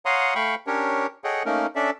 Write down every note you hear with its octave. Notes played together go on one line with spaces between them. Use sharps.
C#5 F5 F#5 A#5 C6 D#6
A3 F5 G5 B5 C#6
C#4 D4 G4 A#4 C#5
G#4 A4 C#5 D#5 F#5 G5
A3 A#3 C#4 D#4 A#4
C#4 D4 A4 D5 E5